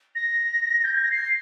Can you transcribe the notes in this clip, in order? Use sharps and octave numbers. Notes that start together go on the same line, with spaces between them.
A#6
G6
G#6
A#6
C7